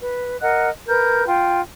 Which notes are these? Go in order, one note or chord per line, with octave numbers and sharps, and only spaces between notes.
B4
A#4 D#5 F#5 F#6
A#4 B4 G6
F4 G5